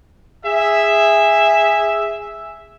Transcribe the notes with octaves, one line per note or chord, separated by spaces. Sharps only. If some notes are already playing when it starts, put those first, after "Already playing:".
G#4 E5